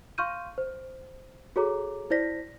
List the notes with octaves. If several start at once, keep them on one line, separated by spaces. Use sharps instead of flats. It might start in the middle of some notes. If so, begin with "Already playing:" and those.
F5 C6 C#6 F6 G6 D#7
C5
F#4 G#4 A4 C#5 A#5 D6
E4 C5 D5 A#6 B6